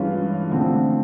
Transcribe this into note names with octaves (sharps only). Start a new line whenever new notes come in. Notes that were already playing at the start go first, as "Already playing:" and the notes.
Already playing: G2 E3 G#3 C#4 F4
D3 F3 A3 C4